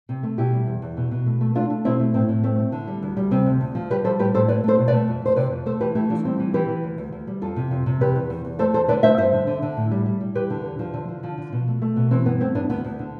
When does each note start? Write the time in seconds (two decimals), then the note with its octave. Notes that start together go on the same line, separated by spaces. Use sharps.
0.09 C3
0.23 A3
0.38 B2 E4 G4
0.53 G3
0.67 E2
0.82 E2
0.97 B2
1.11 B2
1.26 A3
1.41 A3
1.55 A3 D4 F4
1.70 A3
1.85 B2 C4 E4
2.00 A3
2.14 A2 C4
2.29 A2
2.44 A3 C4
2.58 A3
2.72 D3
2.87 G3
3.03 D2
3.17 G3
3.31 C3 C4
3.46 D2
3.61 D2
3.75 F3
3.90 G3 G4 B4
4.04 G3 A4 C5
4.19 A2 G4 B4
4.34 A2 A4 C5
4.48 A3 B4 D5
4.64 A3 A4 C5
4.78 B2
4.88 B4 D5
4.93 A3
5.08 F2
5.22 F2 C5
5.36 C3 B4 D5
5.51 F2
5.66 A3 A4 C5
5.80 E3 G4 B4
5.95 A3 E4 G4
6.10 E3 D4 F4
6.25 G3 C4
6.39 E3
6.54 E3 G4 B4
6.68 E3
6.84 D2
6.98 D2
7.12 D2
7.27 G3
7.42 F2 F4 A4
7.56 C3
7.71 F2
7.86 C3
8.01 E2 G4 B4
8.16 E2
8.30 E2
8.45 E2
8.59 A3 A4 C5
8.74 E2 A4 C5
8.88 D3 B4 D5
9.03 A3 C5 E5
9.18 G2 C5 E5
9.33 D3
9.47 D3
9.62 D3
9.77 A2
9.91 G3
10.06 G3
10.21 G3
10.35 E2 G4 B4
10.50 D3
10.65 E2
10.79 F3
10.94 D3
11.09 F3
11.23 F3
11.38 D3
11.52 B2
11.67 A3
11.82 A3
11.96 B2
12.11 E3 C4
12.26 G2 B3
12.40 A3 C4
12.55 G2 B3 D4
12.70 D2 B3
12.84 D2
12.99 D3